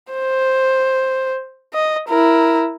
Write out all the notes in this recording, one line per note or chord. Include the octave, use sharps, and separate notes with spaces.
C5
D#5
E4 A#4